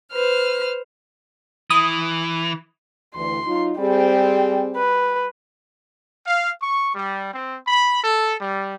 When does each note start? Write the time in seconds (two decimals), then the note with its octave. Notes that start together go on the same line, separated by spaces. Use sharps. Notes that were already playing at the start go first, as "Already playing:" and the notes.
0.12 B4 C5 F6
1.70 E3 D#6
3.16 D2 E3 C6
3.47 F#3 D#4 F4
3.79 G3 C4 G4 G#4
4.76 B4
6.24 F5
6.59 C#6
6.93 G3
7.32 C4
7.68 B5
8.02 A4
8.39 G3